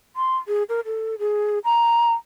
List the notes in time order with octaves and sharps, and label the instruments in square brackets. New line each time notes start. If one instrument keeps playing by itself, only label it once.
[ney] C6
G#4
A#4
A4
G#4
A#5